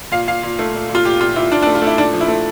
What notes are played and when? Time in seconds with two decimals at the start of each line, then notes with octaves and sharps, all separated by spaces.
0.12 A#2 F5
0.27 A#2 F5
0.43 A#2
0.59 A3
0.74 A#2
0.89 A#2
0.95 F4
1.05 A#2 G4
1.21 A#2 F4
1.36 A#2 E4
1.51 A#2 D4
1.63 D4
1.67 A3
1.75 F4
1.82 A3
1.87 E4
1.97 A#2 D4
2.13 F3
2.21 E4
2.28 A3